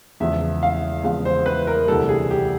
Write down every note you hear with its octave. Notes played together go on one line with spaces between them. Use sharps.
E2 C#3 F3 G#3 E5
F5
E2 C#3 F3 G#3 F5
C5
B4
A#4
D2 C3 E3 G3 A4
G#4
G4